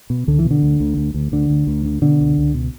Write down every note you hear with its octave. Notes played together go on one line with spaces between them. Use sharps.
B2
C#2 D3
E3
B2
D3
D2
D2
D2
D2
D2 D3
D2
D2
D3
B2 D3
C#2
C#2
B2